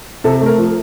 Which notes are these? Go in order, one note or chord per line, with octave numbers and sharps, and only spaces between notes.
C3 A4
A3
A#4
F3